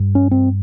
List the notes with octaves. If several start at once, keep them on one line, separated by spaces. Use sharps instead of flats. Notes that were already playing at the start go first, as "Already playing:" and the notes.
Already playing: G2
C#4
C4